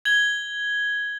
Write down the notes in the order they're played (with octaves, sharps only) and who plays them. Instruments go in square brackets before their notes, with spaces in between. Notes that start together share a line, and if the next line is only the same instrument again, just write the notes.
[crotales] G#6 F#7 G7